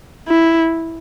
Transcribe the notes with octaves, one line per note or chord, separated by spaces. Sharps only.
E4